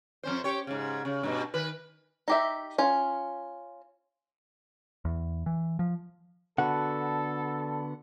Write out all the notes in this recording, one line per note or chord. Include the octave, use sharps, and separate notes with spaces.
F2 C#4 C5
G4 C#5
G#2 C#3
C#3
G2 B2 D#5
D#3 B4
D#4 G4 E5
C#4 F4
E2
E3
F3
D3 B3 F#4 A4 D5 F#5 A5 B5